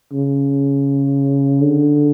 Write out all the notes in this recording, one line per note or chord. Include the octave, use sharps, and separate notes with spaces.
C#3
D3